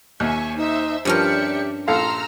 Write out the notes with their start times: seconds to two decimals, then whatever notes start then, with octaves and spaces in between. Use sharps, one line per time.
0.20 D#2 E5 G#5 C#6
0.57 D#4 C5 E5 E6
1.05 G2 F3 C#4 G4 A#4 D5 E5 C#7
1.88 A#1 A4 F5 A#5 C6 E6 F6